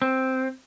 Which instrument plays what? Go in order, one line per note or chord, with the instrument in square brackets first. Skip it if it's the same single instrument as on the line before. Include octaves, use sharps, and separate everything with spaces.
[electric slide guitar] C4